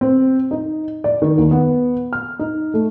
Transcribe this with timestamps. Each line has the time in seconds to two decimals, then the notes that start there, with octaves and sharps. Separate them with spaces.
0.01 C4
0.51 D#4
1.04 D5
1.22 D#3
1.38 D#2
1.51 B3
2.13 F6
2.39 D#4
2.74 A3